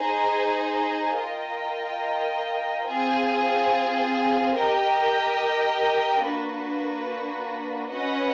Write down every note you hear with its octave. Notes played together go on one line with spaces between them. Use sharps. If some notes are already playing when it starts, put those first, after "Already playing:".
Already playing: D#4 G#4 C5
F4 A#4 D#5 G5
C4 F4 G#4 C5
G4 A#4 D#5 G5
A#3 D4 F#4 B4
C#4 F#4 B4 D#5 F#5